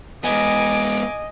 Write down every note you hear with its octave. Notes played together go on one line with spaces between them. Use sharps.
G#3 B3 D#5 G#5 D6